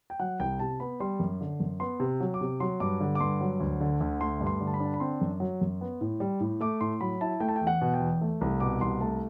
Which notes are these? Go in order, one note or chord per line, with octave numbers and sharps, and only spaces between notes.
G5
F#3 F#5
C2 G5
C3 A5
B3 B5
G3 C6
F#2
D3
F#2
B3 C6
C3
F#3
D6
C3
F#3 C6
G2 D6
D3
D6
G2 C6
F#3
D2
D3
D2
A3 C6
G2
C6
D3
A5
B5
D4
A5
B5
C4 C6
F#2
F#3
F#2
B3
A2
G3
A2
A3 D6
A2 C6
F#3 B5
E4 A5
A3 G5
A5
G5
E2
F#5
B2
G5
E2
A3
C2
B2 D6
C2 C6
A3 A5